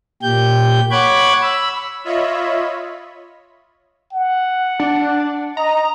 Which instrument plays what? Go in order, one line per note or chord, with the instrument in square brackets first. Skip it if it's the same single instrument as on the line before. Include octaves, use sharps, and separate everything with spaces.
[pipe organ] A#2 G4 G6
C#5 F#5 B5 D6 F#6 G#6
B5 E6
[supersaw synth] F4 C#5 D#5 E5 B5
[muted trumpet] F#5
[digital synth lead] D4
[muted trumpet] D#5 [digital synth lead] A#5